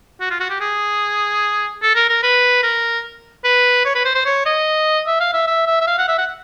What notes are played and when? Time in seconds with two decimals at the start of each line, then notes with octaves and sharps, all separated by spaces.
0.20 F#4
0.31 F4
0.40 F#4
0.50 G4
0.61 G#4
1.83 A4
1.96 A#4
2.09 A#4
2.23 B4
2.63 A#4
3.45 B4
3.85 C#5
3.95 B4
4.05 C5
4.15 C5
4.26 C#5
4.46 D#5
5.07 E5
5.20 F5
5.33 E5
5.47 E5
5.67 E5
5.81 E5
5.87 F5
5.98 F#5
6.08 E5
6.18 F#5